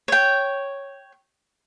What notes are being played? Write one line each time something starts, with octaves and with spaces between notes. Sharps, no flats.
C#5 G5